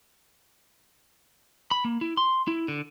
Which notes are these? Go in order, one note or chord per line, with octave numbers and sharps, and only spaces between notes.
B5
A#3
E4
C6
E4
D3